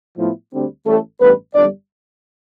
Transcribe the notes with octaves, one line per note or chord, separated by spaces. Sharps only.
A2 F3 B3 E4
D2 D3 G3 C4
A1 A2 G3 A3 A4
A1 G2 D3 G3 B3 B4
G1 F2 E3 G3 D4 D5